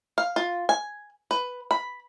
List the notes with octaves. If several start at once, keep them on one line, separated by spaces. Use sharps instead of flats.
F5
F4
G#5
B4
B5